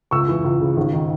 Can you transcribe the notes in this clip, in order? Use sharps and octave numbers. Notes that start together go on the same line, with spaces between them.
C#2 C#6 E6
E3
C#2
C#3
G#1
D#3